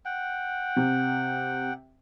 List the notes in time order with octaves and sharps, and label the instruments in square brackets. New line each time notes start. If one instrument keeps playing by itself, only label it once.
[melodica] F#5 G5
[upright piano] C3